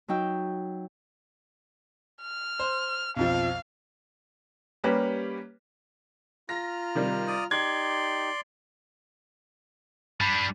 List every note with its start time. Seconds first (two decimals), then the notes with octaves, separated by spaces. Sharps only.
0.08 F#3 D#4 G5 E6
2.22 F6
2.60 C5
3.17 B1 F2 F3 F5
4.84 G3 A#3 C#4 G4 B4
6.49 F4 A#5 F6 A#6
6.95 C3 D#3 G3
7.27 D5 D#6
7.51 D#4 G4 D5 C6 G#6
10.21 G3 D4 B5